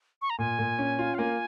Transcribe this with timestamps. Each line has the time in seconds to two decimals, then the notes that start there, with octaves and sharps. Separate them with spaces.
0.22 C#6
0.30 A#5
0.39 A#2 G#5
0.59 A#2
0.79 C#4
0.99 F4
1.14 F5
1.18 A#3 G#5